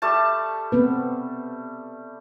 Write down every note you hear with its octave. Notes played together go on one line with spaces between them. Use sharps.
G3 A3 A5
B3 C4 B4